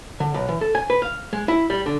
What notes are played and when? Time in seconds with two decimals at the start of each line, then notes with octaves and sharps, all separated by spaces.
0.20 D3
0.34 B1
0.49 E3
0.61 A4
0.75 G#5
0.90 B4
1.02 F5
1.33 G#3
1.48 E4
1.70 G3
1.86 D3